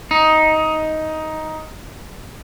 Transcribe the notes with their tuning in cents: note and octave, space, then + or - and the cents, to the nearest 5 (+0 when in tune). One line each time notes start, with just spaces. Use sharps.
D#4 +10